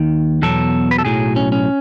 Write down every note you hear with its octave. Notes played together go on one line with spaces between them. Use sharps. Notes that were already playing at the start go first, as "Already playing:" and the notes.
Already playing: D#2 D#3
E2 B2 F#3 A4
B4
A4
B1 A2 F#3 G#4
C#4
C#4